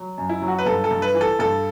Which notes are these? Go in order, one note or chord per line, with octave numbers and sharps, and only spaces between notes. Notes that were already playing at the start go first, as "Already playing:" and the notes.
Already playing: F#3
F#2
E4
F#3
F#4
B4
G2 A4
A4
G2
B4
E3
A4
G2 A4